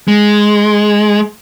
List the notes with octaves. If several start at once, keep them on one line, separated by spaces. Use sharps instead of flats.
G#3